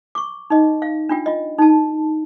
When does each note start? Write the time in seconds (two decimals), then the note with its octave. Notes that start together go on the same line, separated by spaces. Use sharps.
0.15 C#6 D6
0.50 D#4 D#5
0.82 F5
1.09 D4 F4 G5
1.26 F4 D#5
1.58 D#4 A5